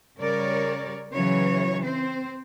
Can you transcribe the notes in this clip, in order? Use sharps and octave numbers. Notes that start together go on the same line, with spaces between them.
C#3 G3 A#4 C#5 D5
C#3 E3 F#3 C#5
C4 C5